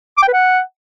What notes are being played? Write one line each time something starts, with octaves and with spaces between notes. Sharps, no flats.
D6
G5
B4
F#5